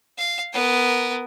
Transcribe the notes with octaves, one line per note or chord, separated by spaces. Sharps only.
F5
B3 A#4